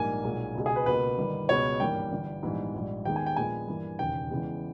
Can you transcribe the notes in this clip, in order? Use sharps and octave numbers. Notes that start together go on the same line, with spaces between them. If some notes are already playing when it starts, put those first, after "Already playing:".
Already playing: A#1 G#2 G3 A#3 G#5
B1 A#2 G#3
C#2 B2 G#3
G#4
B4
C#2 B2 A#3 B4
G1 G2 D#3
C#2 B2 G#3 B3 C#5
G#1 G2 E3 A#3 G5
G1 G2 E3
A#1 G#2 E3 G3 B3
A#1 G#2 G3
D#2 D#3 G#3 B3 G5
G#5
G5
A#1 A#2 G#3 B3 G#5
G2 E3 A#3
E1 D#2 C#3 G5
E2 C#3 E3 G#3 B3